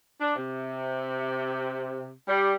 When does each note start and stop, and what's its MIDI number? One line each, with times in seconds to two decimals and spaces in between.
0.20 0.33 62
0.36 2.10 48
2.27 2.54 55